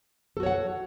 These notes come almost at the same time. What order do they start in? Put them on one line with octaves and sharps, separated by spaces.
A4 F#4 C#5 F#5